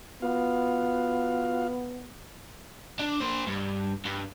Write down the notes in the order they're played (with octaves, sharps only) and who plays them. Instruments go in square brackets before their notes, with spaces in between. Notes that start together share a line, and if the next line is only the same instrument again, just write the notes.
[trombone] B3 [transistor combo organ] F4 F#4 F5
[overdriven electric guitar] D4
A#3 C5
G2
G2